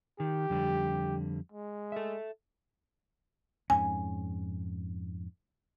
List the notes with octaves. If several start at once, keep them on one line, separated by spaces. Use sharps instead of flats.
D#3 G4
F2 D3 G3
G#3
A4 E5
F2 G#2 C#4 G#5